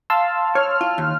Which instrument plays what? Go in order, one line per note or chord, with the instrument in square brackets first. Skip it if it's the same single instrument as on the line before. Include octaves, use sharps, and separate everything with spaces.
[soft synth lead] F5 [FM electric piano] A5 C6 E6
[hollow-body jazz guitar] C#5 [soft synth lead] F6
[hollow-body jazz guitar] F4
D#2